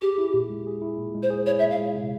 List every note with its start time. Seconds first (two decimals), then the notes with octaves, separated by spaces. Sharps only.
0.02 G4 G#4
0.18 E4
0.34 A#2
0.50 G#3
0.67 G#4
0.82 E4
0.98 A#2
1.15 G#3
1.23 C5
1.30 G#4
1.46 E4 C#5
1.59 E5
1.63 A#2
1.71 F5
1.79 G#3
1.95 C3